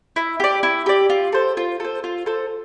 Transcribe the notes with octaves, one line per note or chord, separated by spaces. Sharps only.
E4
G4 D5
E4
G4 D5
F4
A4 C5
F4
A4 C5
F4
A4 C5